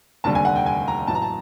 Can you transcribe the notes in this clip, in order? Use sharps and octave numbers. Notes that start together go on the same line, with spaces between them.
F1 D#2 D3 G3 A5
G#5
F#5
G5
G#5
A#5
A1 A2 F#3 A5
A#5
A5